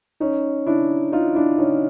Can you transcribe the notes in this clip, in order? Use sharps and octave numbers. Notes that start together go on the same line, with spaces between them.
C#4 D#4
D4 E4
D#4 F4
D4 E4
C#4 D#4